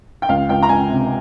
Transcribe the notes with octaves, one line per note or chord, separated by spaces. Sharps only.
G5
C#2 F5
C#2 G5
A#5
C#2 G#5
C3